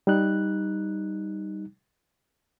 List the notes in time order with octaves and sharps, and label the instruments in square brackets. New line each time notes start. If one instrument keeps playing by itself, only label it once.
[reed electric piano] G3 D#4 F#6